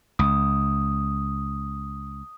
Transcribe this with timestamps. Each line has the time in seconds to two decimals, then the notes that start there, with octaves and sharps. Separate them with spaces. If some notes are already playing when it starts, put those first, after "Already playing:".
0.19 C#2 D#6